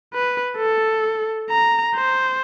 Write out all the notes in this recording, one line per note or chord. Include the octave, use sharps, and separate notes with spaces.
B4
A4
A#5
C5